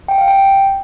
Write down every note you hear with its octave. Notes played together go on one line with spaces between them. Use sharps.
G5
F5
G5